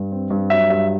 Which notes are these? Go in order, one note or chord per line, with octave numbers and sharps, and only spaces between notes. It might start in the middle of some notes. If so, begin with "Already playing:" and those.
Already playing: G2
C4
G2
F#3 E5
G2 E5